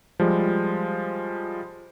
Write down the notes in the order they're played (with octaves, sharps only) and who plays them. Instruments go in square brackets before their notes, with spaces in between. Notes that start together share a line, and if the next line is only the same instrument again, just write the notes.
[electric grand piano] F3 G3 G#3